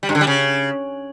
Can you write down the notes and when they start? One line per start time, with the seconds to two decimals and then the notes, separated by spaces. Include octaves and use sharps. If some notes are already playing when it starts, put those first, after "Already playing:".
0.03 G3
0.09 G2
0.15 D3
0.21 G3
0.27 C#3